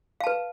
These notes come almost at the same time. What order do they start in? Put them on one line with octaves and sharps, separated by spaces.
F5 A5 B4